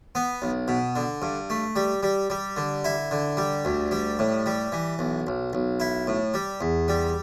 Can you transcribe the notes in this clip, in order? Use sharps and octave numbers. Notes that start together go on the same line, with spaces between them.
B3
B1
B2
D3
G2
A3
G3
G3
G3
D3
E4
D3
G3
D2
G3
A2
G3
E3
B1
B1
B1
E4
A2
G3
E2
G3